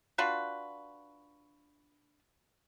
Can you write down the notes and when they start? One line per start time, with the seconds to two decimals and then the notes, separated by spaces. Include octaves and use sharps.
0.18 D4 F4 F#4 B4